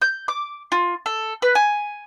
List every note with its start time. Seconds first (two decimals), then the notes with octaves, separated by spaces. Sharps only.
0.02 G6
0.28 D6
0.72 F4
1.06 A4
1.42 B4
1.55 G#5